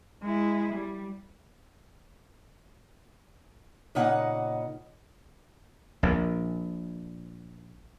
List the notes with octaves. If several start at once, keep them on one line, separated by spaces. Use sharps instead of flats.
G#3 E4
G3
A#2 C#3 A#3 D#4 F#5
A#1 A#2